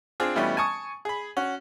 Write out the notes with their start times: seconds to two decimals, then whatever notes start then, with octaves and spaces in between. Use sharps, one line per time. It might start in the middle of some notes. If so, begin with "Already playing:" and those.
0.20 C4 D4 F4 G#4
0.35 B2 E3 G3 A3 B3 C#4
0.57 G#5 A5 C#6 D#6
1.05 G#4 B5
1.37 C#4 F#4